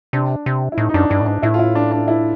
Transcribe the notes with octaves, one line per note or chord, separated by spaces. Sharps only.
C3 D4
C3
E4
A2 D#4
D#4
F#2 D4
G2 D4
A2
G#2 D4
A2 E4
F4
E4
D4
D4
E4